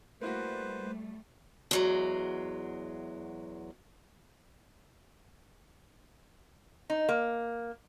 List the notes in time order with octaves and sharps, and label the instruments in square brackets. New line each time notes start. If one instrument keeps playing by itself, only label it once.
[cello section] G3 A3 [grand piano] A#3 E4 F#4 [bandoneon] B4 C5
[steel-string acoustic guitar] E2 F#3 G#3
[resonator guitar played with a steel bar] D#4
A#3